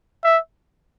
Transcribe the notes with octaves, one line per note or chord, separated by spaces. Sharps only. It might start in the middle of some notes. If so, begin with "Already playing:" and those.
E5